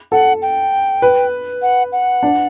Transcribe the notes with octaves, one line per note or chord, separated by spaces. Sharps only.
A4 F#5
G5
B4
F#5
F#5
D4